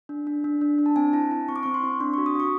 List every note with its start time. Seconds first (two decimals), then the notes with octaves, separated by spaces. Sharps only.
0.09 D4
0.27 D4
0.44 D4
0.61 D4
0.79 D4
0.86 A5
0.96 C4 G#5
1.13 E4 A5
1.31 E4
1.49 C4 C#6
1.56 D6
1.63 C#6
1.66 C4
1.74 C6
1.84 C4
2.00 D4 C6
2.14 C#6
2.18 F#4
2.26 D#6
2.35 F#4 C#6